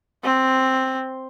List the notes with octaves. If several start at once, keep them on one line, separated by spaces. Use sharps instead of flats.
C4